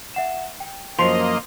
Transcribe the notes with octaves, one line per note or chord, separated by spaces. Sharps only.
E5 F#5 E7
G5
F#2 F3 A#3 C5 D#5 C6 C7 F7